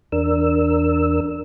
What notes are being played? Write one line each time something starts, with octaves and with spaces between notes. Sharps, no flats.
E2 D4 A#4 E6